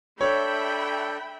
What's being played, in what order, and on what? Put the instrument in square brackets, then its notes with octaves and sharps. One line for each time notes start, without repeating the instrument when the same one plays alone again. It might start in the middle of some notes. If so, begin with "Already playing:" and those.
[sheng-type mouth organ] D4 A4 [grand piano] C#5 [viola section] E5 G5 B5